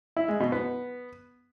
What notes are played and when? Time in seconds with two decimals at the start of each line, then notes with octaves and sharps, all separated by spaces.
0.17 E4
0.28 G#3
0.40 B2
0.52 B3